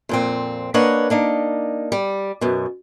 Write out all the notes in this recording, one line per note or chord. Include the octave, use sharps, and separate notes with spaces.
F2 A#2 C4
A#3 D4 B4 C#5 D#5 F#5
A#3 D4 D#4
G3
F#2 B2